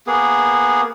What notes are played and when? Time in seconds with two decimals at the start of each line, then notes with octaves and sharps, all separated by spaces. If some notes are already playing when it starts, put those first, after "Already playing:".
0.07 A#3 B3 G#4